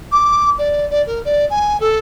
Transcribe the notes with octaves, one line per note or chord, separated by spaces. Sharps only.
D6
D5
D5
A#4
D5
G#5
A4